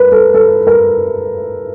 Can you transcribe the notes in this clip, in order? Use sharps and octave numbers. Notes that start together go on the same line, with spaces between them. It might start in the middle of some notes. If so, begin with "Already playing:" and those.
Already playing: A#4 B4
A4
A4
A#4